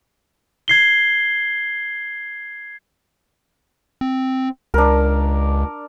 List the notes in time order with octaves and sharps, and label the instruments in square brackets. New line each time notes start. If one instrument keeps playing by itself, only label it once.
[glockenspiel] G#6 C7 G7
[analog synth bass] C4
[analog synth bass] C#2 [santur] D4 A#4